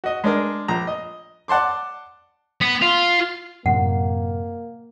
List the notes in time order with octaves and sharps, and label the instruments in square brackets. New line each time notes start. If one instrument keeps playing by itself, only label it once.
[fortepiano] F#4 D#5
G#3 D4 A#4
A#1 A#5
D#5
D5 F#5 A5 C6 D6
[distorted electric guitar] B3
F4
[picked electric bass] F#2 A2 C3 [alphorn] A#3 [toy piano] F#5